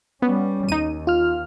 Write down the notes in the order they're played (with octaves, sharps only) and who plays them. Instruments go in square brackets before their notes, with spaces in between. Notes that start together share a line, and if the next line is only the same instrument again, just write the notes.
[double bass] G3 C#4 [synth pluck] B3
[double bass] D#2 [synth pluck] D#4 D#7
[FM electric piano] F4 F6